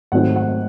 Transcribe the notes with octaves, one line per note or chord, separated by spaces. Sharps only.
G#1 G#2 F#3 A3 C4 F#5
F#5